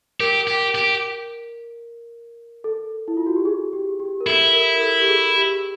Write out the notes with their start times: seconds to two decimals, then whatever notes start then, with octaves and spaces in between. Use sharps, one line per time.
0.20 G4 A#4
0.48 G4
0.75 G4
2.64 A4
3.08 E4
3.17 F4
3.26 F#4
3.36 G4
3.45 G#4
3.73 G4
4.00 G4
4.21 A#4
4.27 E4 A4
4.54 A#4
4.74 A#4
4.81 A4
5.01 G4
5.08 G#4
5.35 G4